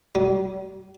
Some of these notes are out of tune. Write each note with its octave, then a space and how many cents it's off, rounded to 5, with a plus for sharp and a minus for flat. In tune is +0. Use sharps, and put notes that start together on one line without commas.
G3 -40